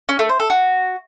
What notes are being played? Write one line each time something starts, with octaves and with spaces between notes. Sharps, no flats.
C#4
A3
C5
A4
F#4